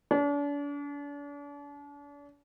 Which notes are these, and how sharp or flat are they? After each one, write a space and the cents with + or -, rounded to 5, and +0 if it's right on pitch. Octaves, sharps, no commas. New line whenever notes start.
D4 -40